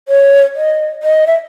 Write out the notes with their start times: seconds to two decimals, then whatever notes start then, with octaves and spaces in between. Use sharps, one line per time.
0.08 C#5
0.56 D#5
1.03 D#5
1.27 E5